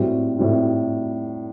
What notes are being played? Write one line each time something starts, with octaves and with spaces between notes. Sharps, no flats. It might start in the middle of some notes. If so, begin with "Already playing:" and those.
Already playing: A2 G3 C4 F#4
A2 G3 C4 F#4